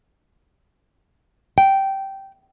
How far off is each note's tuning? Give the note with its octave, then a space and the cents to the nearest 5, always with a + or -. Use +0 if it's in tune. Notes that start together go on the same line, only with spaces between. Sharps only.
G5 -10